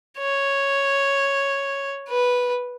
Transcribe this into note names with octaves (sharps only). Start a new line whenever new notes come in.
C#5
B4